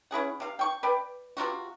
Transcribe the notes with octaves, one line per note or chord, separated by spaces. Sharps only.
C#4 E4 G#4 F#5
C3 F5
G5 C#6
B4 D5 G5
C3 F#3 F4 F#4